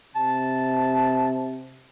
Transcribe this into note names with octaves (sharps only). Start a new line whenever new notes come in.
C3 A5